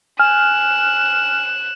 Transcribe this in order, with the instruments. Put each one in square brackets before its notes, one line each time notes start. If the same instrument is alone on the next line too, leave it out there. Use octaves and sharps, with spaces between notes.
[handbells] G#5 [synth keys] F6 [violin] F#6 E7